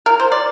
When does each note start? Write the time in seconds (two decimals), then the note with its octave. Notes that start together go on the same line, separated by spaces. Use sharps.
0.06 A#4
0.20 C5
0.32 D5